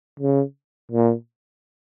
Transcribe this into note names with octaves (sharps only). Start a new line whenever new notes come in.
C#3
A#2